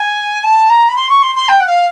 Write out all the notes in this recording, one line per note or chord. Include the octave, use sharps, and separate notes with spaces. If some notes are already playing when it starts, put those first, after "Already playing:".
Already playing: G#5
A5
A#5
B5
C6
C#6
C6
C6
G5
F#5
F5